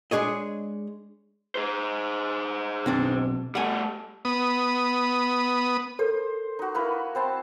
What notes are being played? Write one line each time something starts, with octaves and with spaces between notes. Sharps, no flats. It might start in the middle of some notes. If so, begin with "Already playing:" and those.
G#3 D4 G#4 C#5 D#5
G#4 C5
B1 C4 D4
G3 A3 F#5 G#5
B3 D#6
A4 A#4 C5
D#4 F#4
A#3 E4 B4
C4 C5 A5